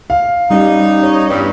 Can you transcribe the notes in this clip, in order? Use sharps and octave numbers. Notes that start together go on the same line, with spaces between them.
F5
G3 C#4 D#4 G4
C#5
E2 G2